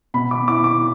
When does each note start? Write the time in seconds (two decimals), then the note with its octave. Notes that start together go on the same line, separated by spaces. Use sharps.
0.14 B2 B5
0.31 D6
0.48 E4 D6
0.64 D6